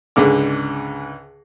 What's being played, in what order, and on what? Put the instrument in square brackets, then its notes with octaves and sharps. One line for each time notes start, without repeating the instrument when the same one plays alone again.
[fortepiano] C#2 G#2 D3 D6